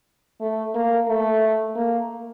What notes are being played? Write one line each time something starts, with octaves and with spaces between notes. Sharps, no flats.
A3
A#3
A3
A#3